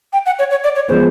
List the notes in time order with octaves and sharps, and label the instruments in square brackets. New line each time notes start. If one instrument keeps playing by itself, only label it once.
[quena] G5
F#5
C#5
C#5
D5
C#5
[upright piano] F3 G#3 B3 [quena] C5